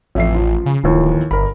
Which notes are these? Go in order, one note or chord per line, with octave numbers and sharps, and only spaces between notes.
A1 F2 E5 C7
F3
C#3
D1 D#2 E3 F3
G1 A#4 B5